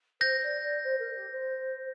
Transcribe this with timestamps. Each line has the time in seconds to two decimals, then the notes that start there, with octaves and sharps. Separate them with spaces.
0.21 C5 G6 A#6
0.42 D5
0.63 D5
0.83 C5
0.99 A#4
1.15 G4
1.30 C5